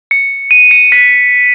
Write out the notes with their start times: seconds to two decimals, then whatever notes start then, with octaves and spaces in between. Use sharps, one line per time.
0.11 C#7
0.51 D#7
0.71 C#7
0.92 B6